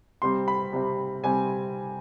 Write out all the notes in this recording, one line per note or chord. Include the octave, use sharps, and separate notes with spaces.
C3 G3 C4 C6
B5
C3 G3 C4
C3 G3 C4 G#5